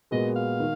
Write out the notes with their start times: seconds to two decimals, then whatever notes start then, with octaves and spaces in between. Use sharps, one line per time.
0.11 A#2 G#3 B3 F#4 D#5
0.36 F5
0.60 D#3